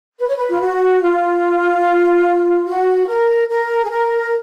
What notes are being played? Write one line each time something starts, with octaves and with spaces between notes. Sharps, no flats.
B4
C#5
B4
F4
F#4
F4
F#4
A#4
A#4
G#4
A#4